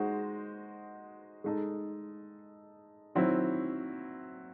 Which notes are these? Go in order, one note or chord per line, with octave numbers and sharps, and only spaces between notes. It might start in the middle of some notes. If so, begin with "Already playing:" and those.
Already playing: G#3 D#4 F#4 C5
G#3 D#4 A4
D#3 F#3 C4 E4